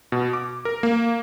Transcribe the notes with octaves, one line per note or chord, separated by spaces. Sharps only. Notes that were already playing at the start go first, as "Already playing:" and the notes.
B2
D6
A#4
A#3